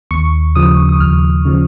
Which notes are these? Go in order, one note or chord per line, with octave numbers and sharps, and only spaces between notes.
D#2 C#6
C#3 F3 D#6
D#6
D#2 F6
C#3 F3